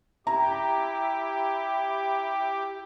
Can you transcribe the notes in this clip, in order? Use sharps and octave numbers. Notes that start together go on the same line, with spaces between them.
E4 G4 A#5